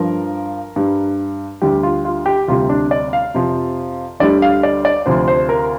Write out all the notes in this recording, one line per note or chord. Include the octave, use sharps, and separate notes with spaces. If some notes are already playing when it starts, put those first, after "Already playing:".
Already playing: G2 F3 A#4
G2 G3
D2 D3 G3 G4
F4
F4
G4
D2 C3 G3 F4
D4
D5
F5
F2 C3 F3
D2 D3 G3 D5
F5
D5
D5
D2 C3 F3 C5
C5
A#4